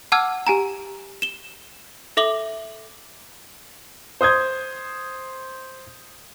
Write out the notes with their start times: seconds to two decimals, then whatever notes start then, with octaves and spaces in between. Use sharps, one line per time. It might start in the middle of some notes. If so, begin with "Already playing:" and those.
0.12 F#5 A5 D6 E6 F6 G#6
0.47 G4 G#5 A#5
1.22 E7 G7
2.17 A4 E5 D6 F#7 G7
4.21 C5 D#6 G6 G#6